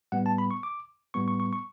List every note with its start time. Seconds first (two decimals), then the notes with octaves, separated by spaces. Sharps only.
0.12 A2 G3 B3 F#5
0.26 A5
0.38 B5
0.51 C#6
0.63 D6
1.14 A2 G3 B3 C#6
1.28 C#6
1.40 C#6
1.53 C#6